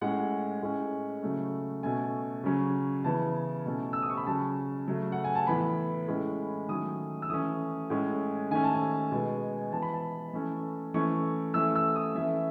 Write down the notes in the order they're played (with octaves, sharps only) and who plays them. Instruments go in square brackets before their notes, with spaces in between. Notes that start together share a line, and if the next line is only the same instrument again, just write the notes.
[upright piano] A2 G#3 C#4 F#5
A2 G#3 C#4
C#3 F#3 A3 C#4
B2 A3 C#4 G#5
C#3 F#3 C#4
C#3 E3 B3 A5
B2 A3 C#4
E6
D#6
C#6
B5
C#3 F#3 C#4 A5
C#3 F#3 A3
F#5
G#5
A5
A2 E3 B3 B5
A2 G#3 C#4
D#3 F#3 A3 C#4 D#6
E6
E3 A3 C#4 D#6
A2 G#3 C#4
D#3 A3 C#4 G#5
A5
G#5
B2 G#3 B3
E3 B3 A5
B5
A5
E3 A3 C#4
E3 A3 C#4 C#6
E3 A3 C#4 E6
E6
D#6
E3 A3 C#4 E5